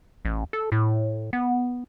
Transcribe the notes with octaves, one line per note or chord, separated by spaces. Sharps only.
A1
A4
A2
B3